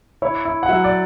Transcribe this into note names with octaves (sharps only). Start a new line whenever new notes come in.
E4 C#5
E4
F#5
F#3 E5
D5